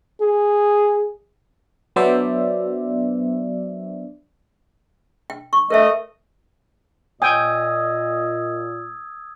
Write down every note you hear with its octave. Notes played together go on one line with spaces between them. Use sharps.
G#4
F#3 B3 D4 C5 D5 E5
G5
C#6
A3 A#4 C5 D#5 E5
A#2 D#5 G5 G#5 D#6 E6 G#6